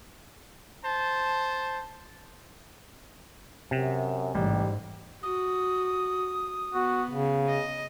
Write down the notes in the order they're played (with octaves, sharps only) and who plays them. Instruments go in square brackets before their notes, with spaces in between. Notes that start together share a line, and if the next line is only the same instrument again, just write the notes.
[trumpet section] C5 A5
[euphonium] F#2 [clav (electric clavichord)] C3
[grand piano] A1 [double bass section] G#2 [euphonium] G3
[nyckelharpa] F#4 [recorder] D#6
[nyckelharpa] B3 [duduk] F#4
[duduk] C#3
[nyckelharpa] D#5